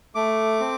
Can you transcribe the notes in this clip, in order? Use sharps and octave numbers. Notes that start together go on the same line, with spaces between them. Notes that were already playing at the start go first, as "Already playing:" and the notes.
A3 D6
C4